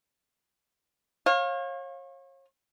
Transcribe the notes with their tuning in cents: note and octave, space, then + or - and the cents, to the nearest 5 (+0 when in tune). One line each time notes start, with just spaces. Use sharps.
C#5 -35 F5 +15